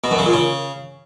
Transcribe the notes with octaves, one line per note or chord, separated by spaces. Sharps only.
B2
F#2
C#3
A#2
C#3